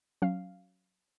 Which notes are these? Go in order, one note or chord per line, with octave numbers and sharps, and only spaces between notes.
F#3 C#4 F5